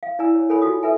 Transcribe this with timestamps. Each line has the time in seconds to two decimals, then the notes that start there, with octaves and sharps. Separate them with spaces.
0.03 F5
0.19 E4 D5 G#5 A#5 E6
0.35 C#5
0.49 A4 A#4 C#5 G#5 B5
0.62 D#4 F4 F#4 D#6
0.83 A4 B4 E5 G#5